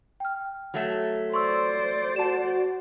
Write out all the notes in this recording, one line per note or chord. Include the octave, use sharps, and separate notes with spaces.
G5 F6
F#3 A3 E5
C5 D5 C6 C#6 E6
F#4 A5 E7